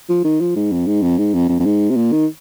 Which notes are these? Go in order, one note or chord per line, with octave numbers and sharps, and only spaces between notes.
F3
D#3
F3
G#2
F2
G#2
F2
G#2
F2
F2
F2
G#2
C3
A#2
D#3